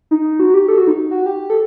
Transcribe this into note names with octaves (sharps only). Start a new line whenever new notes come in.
D#4
F#4
G4
A4
F#4
D#4
F#4
G4
A4